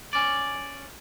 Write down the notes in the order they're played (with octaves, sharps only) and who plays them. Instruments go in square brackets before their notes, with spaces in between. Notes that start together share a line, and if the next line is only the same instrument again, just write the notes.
[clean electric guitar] C#4 D5